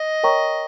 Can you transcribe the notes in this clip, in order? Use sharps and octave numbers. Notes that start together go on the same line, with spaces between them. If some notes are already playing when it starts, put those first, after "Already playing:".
Already playing: D#5
A#4 C#5 G5 A#5 C#6